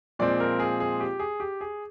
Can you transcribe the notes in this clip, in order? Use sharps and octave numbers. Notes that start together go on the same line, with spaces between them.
A#2 F3 G#3 C4 D5
A#4
G#4
G#4
G4
G#4
G4
G#4